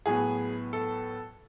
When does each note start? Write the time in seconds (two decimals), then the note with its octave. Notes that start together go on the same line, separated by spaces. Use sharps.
0.06 A2 F#3 B3 G#4
0.73 A4